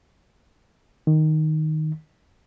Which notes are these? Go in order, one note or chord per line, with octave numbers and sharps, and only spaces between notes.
D#3